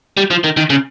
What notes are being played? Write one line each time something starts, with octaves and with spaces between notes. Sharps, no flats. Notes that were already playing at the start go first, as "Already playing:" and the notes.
G3
F3
D#3
D#3
C#3